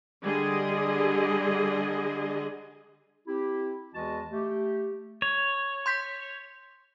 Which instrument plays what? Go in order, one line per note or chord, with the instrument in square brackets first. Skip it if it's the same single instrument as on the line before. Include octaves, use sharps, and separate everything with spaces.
[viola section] D3 G3 G#4 D#5
[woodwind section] C4 E4 G4
E2 E3 G#3 F#4 D#5 A5
A3 G4
[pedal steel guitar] C#5
[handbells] C6 G6 B6